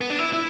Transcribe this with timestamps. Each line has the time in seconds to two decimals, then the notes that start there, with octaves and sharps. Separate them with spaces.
0.01 B3
0.10 D4
0.19 E4
0.33 E4